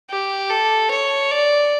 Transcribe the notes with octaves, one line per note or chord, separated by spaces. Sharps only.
G4
A4
C#5
D5